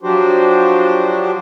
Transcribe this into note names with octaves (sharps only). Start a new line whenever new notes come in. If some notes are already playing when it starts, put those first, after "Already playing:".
F3 F#3 D4 F#4 G4 C5